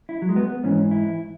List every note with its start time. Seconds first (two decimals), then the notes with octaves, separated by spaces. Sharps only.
0.09 E4
0.22 F#3
0.29 G#3
0.36 B3
0.63 G#2 E3 C#4
0.91 E4